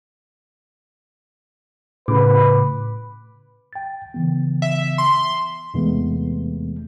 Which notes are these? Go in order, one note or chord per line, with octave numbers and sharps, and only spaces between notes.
A2 C#3 B4 D6
G5 A6
C#3 E3 B3
E5
C6
E2 C3 E3 G#3 A3 B3